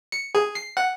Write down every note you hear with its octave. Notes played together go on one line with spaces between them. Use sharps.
C#7
G#4
C7
F#5